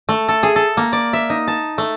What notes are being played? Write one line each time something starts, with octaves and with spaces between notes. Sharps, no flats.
A3
A4
G#4
A4
A#3
D5
E5
D#4
A5
A3